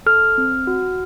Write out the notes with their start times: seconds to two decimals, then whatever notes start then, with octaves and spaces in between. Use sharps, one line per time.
0.06 A4 F6
0.38 C4
0.67 F#4